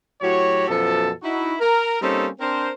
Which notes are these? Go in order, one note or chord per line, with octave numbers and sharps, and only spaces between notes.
A2 F#3 F#4 G4 C#5
F#2 B2 F3 A4
D#4 E4 F#4
A#4
G3 A#3 C4 C#4 D#4 A4
C4 D4 A#4 C5